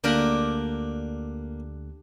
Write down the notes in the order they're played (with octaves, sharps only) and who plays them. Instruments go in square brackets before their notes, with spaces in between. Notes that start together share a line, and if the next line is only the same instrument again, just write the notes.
[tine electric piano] D2 D3 F#6 [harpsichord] A#3 [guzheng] D4 G4 A#4